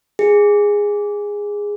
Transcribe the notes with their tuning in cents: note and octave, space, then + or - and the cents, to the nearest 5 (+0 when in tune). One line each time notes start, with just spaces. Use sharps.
G#4 -10